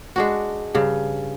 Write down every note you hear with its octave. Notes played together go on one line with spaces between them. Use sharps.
G#3 D4 F#4
G2 C#3